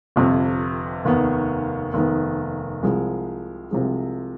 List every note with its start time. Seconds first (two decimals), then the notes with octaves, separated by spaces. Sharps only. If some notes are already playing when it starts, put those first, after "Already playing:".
0.16 G1 F2 C3
1.05 F1 D#2 D#3 B3
1.94 F1 D#2 D#3 B3
2.83 C2 C3 F3 G#3
3.71 C2 C3 F3 G#3